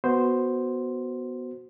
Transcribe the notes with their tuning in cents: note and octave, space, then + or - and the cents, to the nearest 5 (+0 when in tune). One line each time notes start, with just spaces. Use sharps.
B3 +0 F#4 +0 C5 +0